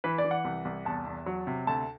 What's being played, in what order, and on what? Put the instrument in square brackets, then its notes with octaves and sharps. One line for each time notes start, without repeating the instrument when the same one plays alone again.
[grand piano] E3 B4
D5
E3
F#5
C2
C2
E2 A5
E2
F#3
C3
D2 A5